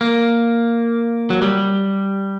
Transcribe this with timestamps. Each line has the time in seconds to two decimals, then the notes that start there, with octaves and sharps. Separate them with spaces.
0.01 A#3
1.30 F#3
1.42 G3